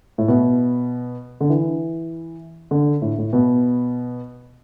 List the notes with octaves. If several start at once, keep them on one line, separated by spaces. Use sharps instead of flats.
A2
B2
D3
E3
D3
A2
A2
B2